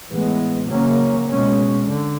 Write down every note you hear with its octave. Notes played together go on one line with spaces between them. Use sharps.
A2 E3 G#3 B3
C#3 F#3 A#3 C#4
B2 G#3 C#4
D3